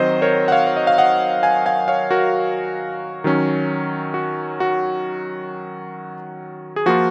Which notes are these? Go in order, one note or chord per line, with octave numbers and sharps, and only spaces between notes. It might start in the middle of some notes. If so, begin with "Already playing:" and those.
Already playing: D#3 F#3 C4 C5 D#5
A#4 C#5
F#5
C#5 F5
C#5
D#5
F5
D#5 F#5
F5 G#5
F5 G#5
C#5 F5
F#4 A#4
D#3 F#3 C#4
F#4
F#4
G#4
F3 A#3 F4 F#4